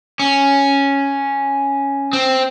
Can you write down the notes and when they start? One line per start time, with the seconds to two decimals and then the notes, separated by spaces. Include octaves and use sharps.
0.19 C#4
2.13 C4